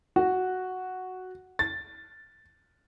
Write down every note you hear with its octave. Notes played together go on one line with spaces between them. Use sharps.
F#4
A6